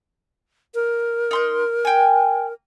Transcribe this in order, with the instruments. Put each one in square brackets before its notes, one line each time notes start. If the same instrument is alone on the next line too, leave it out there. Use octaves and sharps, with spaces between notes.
[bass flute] A#4
[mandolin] D#4 C6 G6
G5 G#5